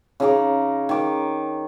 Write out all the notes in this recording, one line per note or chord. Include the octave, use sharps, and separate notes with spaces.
C#3 D#4 A#5 D6
D#3 D6